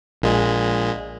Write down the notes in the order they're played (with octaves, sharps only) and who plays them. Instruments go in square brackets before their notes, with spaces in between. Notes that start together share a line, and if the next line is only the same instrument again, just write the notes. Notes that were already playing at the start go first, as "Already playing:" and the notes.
[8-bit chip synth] A#1 A#2 G#3